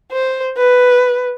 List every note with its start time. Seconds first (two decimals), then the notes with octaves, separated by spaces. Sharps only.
0.12 C5
0.57 B4